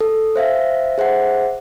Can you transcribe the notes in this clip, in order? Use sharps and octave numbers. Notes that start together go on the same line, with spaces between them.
A4
C5 E5 F5
G#4 C5 E5 F#5